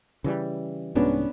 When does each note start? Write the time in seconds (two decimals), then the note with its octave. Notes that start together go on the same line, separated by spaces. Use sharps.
0.24 C#3 E3 G3
0.95 C2 G#2 B3 C#4 D4